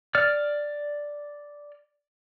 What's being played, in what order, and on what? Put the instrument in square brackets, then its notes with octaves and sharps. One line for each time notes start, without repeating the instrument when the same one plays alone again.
[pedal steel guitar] D5 F6